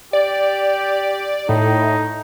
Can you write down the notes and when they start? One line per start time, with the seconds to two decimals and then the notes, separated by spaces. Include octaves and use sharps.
0.13 G4 D5
1.49 A2 D#4